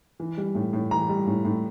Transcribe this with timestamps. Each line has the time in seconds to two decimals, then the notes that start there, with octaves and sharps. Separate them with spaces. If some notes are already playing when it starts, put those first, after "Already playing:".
0.20 E3
0.37 G3
0.55 A2
0.73 A2
0.91 E3 A#5
1.09 G3
1.27 A2
1.45 A2